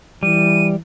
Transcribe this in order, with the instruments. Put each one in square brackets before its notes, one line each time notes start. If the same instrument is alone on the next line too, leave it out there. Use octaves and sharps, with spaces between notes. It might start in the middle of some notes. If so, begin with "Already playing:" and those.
[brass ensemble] E3 [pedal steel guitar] G3 [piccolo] D#7